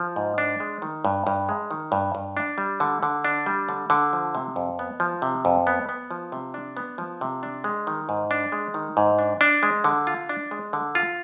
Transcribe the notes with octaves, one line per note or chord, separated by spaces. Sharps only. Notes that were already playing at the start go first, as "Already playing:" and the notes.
Already playing: F3
G#2
D4
G#3
D#3
G2
G2
G#3
D#3
G2
G2
D4
G3
D3
D3
D4
G3
D3
D3
F3
C3
F2
B3
F3
C3
F2
B3
B3
F3
C3
D4
B3
F3
C3
D4
G#3
D#3
G#2
D4
G#3
D#3
G#2
D4
D4
G#3
D3
F4
D4
G#3
D3
F4